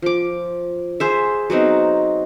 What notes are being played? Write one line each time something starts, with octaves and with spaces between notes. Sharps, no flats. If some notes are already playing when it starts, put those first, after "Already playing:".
F3 D6
G#4 C5 E5
F#3 B3 C4 D#4